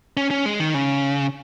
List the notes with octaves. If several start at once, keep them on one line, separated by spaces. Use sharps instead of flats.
C#4
C#4
G#3
D#3
C#3